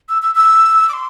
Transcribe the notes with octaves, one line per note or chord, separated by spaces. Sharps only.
E6
E6
E6
D6
C6